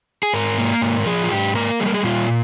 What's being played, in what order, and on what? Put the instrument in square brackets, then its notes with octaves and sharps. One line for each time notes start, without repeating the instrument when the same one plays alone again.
[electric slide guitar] G#4
G#2 A#4
A#3
G#2
F3 G#4
F4
G#2 G4
A#3 A#4
G3 G#4
A#4
G#4
A#2 F4